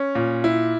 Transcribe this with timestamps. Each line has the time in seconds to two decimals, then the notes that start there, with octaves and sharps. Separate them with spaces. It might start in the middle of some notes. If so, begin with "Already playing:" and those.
Already playing: C#4
0.15 A#2
0.44 E4